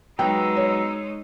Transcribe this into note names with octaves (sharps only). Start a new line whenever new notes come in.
F#3 G#3 B3 D#4 G5 A#5 E6
C#5